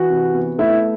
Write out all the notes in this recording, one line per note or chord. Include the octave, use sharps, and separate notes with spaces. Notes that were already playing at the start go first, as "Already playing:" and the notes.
Already playing: E3 F#4
C3
B3
A3 E4